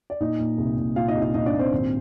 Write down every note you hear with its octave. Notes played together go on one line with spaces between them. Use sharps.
D5
A#2 D#4 D#5
A#2
C2
A#2
A#2 F4 F5
D#4 D#5
C2
D#4 D#5
A#2 D#4 D#5
D4 D5
A#2
C4 C5
G#1